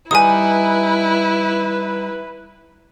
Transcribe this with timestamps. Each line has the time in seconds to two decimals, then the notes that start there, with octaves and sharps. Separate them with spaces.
0.11 G3 D#4 E4 B4 G#5 D#6